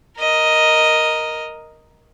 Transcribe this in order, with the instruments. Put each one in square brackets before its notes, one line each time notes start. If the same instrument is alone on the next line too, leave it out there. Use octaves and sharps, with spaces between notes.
[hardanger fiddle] A#4 D#5